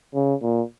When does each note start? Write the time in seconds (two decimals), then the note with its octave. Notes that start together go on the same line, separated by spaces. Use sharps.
0.14 C#3
0.42 A#2